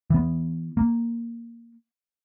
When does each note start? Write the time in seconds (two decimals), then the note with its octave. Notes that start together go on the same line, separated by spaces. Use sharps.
0.10 E3 B3
0.77 A#3